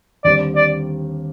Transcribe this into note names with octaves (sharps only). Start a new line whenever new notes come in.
D#2 D3 G3 C4 D5
D5